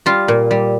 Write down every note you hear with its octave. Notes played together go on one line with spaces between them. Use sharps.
G3 F4
A#2
G3